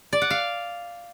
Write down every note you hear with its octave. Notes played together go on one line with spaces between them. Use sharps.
D5
F#5
F5